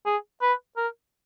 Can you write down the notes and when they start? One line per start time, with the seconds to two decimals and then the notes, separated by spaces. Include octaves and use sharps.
0.06 G#4
0.42 B4
0.77 A#4